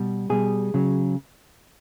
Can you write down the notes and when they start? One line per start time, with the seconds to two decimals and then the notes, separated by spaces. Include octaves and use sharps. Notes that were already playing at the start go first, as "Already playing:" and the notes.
Already playing: B2 G3
0.30 B2 G3 G#4
0.74 C#3 F#3